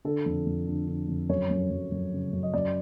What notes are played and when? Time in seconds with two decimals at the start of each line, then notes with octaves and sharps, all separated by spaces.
0.05 D3 A4
0.26 F2
0.46 F2
0.67 D3
0.88 D3
1.08 F2
1.29 F#2 C#5
1.50 F#2
1.71 F#2
1.92 F#2
2.12 C#3
2.33 F#2
2.43 D#5
2.54 F#2 D5